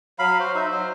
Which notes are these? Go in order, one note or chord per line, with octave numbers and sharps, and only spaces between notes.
F#3 F5 B5
F#4 C5
D#4 E5
F#3 C5